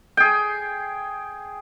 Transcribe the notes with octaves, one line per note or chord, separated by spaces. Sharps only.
G#4 G5